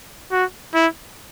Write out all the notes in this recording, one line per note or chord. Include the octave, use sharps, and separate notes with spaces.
F#4
E4